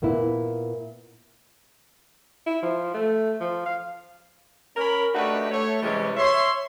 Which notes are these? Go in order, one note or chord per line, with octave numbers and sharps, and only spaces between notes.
A#2 A#3 B3 E4
E4
F3
A3
F3
F5
C#4 A#4 B5
A3 D4 D#4 F#4 G4 B4
A3 C#5
C3 E3 G3 G#3 C#4
C#5 E5 C6